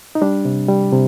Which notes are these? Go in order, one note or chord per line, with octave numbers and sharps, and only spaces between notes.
D#4
G3 D4
C3
G3
C3